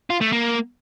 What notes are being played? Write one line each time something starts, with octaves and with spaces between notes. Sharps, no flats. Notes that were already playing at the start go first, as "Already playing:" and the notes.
F4
A3
A#3